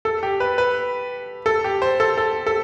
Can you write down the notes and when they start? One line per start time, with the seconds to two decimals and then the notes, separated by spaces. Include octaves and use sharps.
0.05 A4
0.23 G4
0.40 B4
0.58 B4
1.46 A4
1.64 G4
1.82 C5
2.00 A4
2.18 A4
2.47 A4